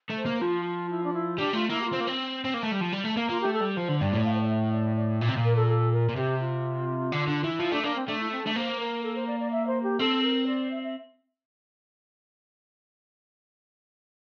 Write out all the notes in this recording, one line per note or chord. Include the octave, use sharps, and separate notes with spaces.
A3
C5
A#3
F3 F4
F4
E4
D4
E4
G3 D4
A3 F4
A#3 E4
G4
F4
C4
A#3
C4
C4
A#3
A3
G3
F3
G3
A3
A#3
A#3 F4
A3 G4
A4
G3
F3 C5
D3
G2 D5
A2
F5
C5
D5
E5
D5
D5
A#2
C3
A#2
A#4
A4
A4
A#4
A#2
C3 G4
F4
D3
D3
E3
F3 E4
A3 D4
A#3 D4
C4
A3 D4
E4
C4
A3 D4
A#3 C5
A#4
A4
C5
D5
D5
E5
C5
G4
C4 A4
A#4
D5
E5
E5